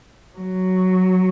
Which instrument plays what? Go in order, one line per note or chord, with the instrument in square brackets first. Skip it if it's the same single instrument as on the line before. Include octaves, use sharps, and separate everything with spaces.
[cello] F#3